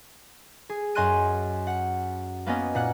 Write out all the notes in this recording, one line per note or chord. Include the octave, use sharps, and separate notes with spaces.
G#4
F#2 D#5 G#5 C6 F#6 D#7
F#5
A#3 B3 C#4 D#5
A#2 F#5 F#6